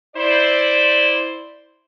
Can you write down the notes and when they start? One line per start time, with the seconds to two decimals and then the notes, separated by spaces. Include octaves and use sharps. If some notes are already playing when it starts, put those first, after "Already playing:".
0.16 E4 C5 D5